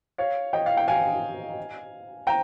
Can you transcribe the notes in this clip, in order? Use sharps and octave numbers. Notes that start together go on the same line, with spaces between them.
C#5 F5
D#5 G5
F5
G5
F5 G#5
G5 A#5